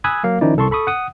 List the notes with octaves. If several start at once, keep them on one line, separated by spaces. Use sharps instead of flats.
G#5 B5 D#6 E6 F#6 G#6
F#3 A#3 F5
D#3 F3 C#4 D#4 E4 D5
C2 A4 A5 C6 C#6
A4 B5 C#6 D#6
F#5 D#6